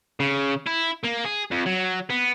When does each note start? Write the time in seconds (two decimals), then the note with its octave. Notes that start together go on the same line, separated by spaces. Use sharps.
0.20 C#3
0.66 E4
1.03 A#3
1.25 G#4
1.51 F2
1.66 F#3
2.10 B3